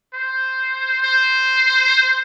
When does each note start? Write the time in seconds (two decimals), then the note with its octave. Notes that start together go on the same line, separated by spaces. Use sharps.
0.14 C5
1.03 C5